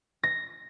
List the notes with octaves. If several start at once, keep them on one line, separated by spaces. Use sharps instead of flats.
A#6